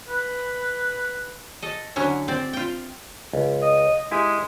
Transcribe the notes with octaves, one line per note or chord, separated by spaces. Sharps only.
B4
A4 D#5
D3 F#3 C#4 E4
C4 D5
F4 G5
C#2
D#5
G#3 E4 G4 G#5